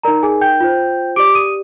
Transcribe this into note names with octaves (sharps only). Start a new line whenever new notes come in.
D#4 A#4 D5 A#5
G#4 G#5
G5 G6
F4 C5
G4 D5 D6 D7
D#6 D#7